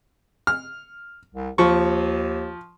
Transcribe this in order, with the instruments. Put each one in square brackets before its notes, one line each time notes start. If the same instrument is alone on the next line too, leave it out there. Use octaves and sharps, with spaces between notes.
[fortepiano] F6
[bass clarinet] C2
[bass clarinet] D#2 [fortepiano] F3 C#6